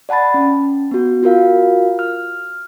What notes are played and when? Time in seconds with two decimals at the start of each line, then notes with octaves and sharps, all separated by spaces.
0.09 D5 F#5 A5 B5 A6
0.34 C#4
0.91 B3 F#4
1.23 F4 F#4 A#4 F5
1.99 F6